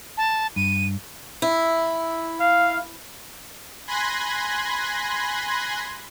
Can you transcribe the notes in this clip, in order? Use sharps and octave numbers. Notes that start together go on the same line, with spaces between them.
A5
G2 D#7
E4
F5
G#5 B5 C6 F#6 G#6 A#6